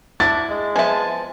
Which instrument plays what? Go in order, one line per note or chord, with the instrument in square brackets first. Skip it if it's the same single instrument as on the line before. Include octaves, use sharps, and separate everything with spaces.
[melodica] D4 [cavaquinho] E4 [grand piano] A6
[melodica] G#3
[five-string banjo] F3 B3 E5 [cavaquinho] G#5 A5